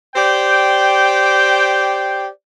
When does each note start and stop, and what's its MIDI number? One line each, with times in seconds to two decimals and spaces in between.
0.16 2.27 67
0.16 2.27 72
0.16 2.27 74
0.16 2.27 79